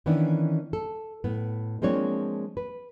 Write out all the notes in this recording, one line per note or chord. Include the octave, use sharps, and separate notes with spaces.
D#3 E3 B3 C#4 D4 E4
A4
A2 B3
F3 G#3 A#3 C4 D4 C#5
B4